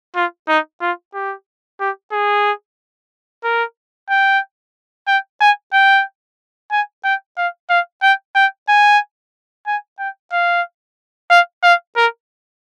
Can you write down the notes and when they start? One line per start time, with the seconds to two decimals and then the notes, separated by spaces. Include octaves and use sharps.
0.15 F4
0.48 D#4
0.81 F4
1.14 G4
1.80 G4
2.12 G#4
3.44 A#4
4.10 G5
5.07 G5
5.41 G#5
5.73 G5
6.71 G#5
7.04 G5
7.38 F5
7.70 F5
8.03 G5
8.35 G5
8.69 G#5
9.67 G#5
9.99 G5
10.32 F5
11.30 F5
11.64 F5
11.96 A#4